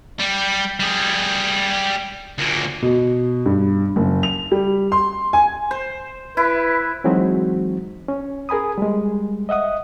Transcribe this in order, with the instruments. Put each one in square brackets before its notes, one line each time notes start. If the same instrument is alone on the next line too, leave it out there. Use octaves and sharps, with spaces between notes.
[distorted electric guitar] G3
G3 G#4
D2 A#2
[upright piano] B2
G2
F#1
F7
G3
C6
G#5
[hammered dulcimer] C5
[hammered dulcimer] E4 [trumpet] B4
[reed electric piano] E3 F#3 G#3 C4 D#4 F#4
C#4
G#4 A#4 G#5 B5 D#6
G3 G#3
D#5 E5 F#5 D#6